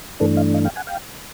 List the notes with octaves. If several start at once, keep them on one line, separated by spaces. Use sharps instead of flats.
G2 E3 A3 D4 A4 B4
D#5 F5
D#5 F5
F5 G5
F#5 G#5
F5 G5